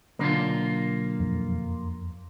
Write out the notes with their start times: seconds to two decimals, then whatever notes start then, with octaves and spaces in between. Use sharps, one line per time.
0.19 B1 D3 A#3 F4
1.20 F2